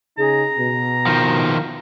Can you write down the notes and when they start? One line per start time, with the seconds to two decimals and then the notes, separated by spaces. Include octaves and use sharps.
0.18 C#3 D#4 G#4 A#5
0.59 B2
1.07 D#3 F3